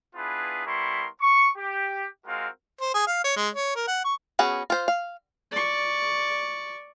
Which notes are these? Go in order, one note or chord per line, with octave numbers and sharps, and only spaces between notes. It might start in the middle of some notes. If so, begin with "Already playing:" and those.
B3 D4 E4 F4 G#4 B4
G3 B3 E4 A#4 C6 C#6
C#6
G4
G#3 C4 F4 F#4 A#4 F5
C5
G#4
F5
C#5
G#3
C#5
A#4
F#5
C#6
B3 C#4 F#4 G#4
F4 C5
F5
D5 C#6